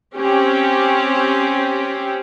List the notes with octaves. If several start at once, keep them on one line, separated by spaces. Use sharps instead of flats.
C4 C#4 G4